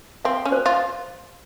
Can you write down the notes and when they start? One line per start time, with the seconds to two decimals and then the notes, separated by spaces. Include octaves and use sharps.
0.25 C4 F5
0.45 C#4
0.52 C5
0.66 F4